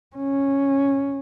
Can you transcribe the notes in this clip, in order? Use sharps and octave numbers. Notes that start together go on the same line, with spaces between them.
C#4